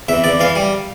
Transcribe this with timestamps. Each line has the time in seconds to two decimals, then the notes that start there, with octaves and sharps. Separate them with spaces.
0.08 E2 E5
0.24 E2 D5
0.40 E3 F5
0.56 G3